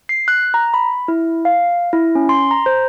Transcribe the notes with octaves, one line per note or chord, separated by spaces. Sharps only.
C7
F#6
A#5
B5
E4
F5
E4
C#4
C6
A#5
C5